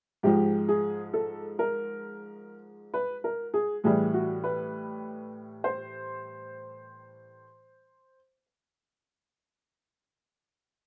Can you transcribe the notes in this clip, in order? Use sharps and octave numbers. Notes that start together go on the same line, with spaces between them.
G#2 F3 G#3 G4
G#4
A4
A#4
B4
A#4
G#4
A2 E3 G3 G#4
F#4
B4
C5